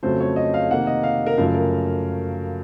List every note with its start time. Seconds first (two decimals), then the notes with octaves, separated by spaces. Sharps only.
0.03 F2 C#3 F#3 A3 C5
0.20 C#5
0.36 D#5
0.54 F5
0.71 C3 D#3 A#3 F#5
0.87 D#5
1.03 F5
1.26 A#4
1.37 F#2 C#3 F3 A3 F5
1.54 A#4